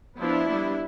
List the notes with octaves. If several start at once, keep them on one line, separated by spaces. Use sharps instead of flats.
F3 B3 D4 E4
G3 B3 D4